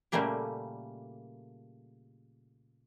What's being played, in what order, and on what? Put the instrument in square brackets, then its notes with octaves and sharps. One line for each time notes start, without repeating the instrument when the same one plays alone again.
[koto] A#2 C#3 G3 A3 A#3 G4